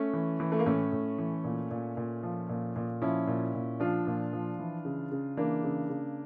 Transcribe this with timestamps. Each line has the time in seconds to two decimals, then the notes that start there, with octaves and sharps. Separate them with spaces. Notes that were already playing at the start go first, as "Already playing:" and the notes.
Already playing: A3 C#4
0.13 E3
0.40 E3
0.52 A3
0.59 A#3
0.66 A2 A3 C#4
0.92 A2
1.18 E3
1.44 A#2
1.71 A#2
1.97 A#2
2.23 F3
2.49 A#2
2.76 A#2
3.02 F3 C#4 E4
3.27 A#2
3.54 A#2
3.80 F3 D4 F4
4.07 A#2
4.33 F3
4.59 E3
4.85 C#3
5.12 C#3
5.37 E3 A#3 D4
5.63 C#3
5.90 C#3